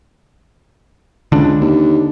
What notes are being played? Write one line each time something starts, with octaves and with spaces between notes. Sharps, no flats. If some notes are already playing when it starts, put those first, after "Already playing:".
C#2 D3 D4
D#2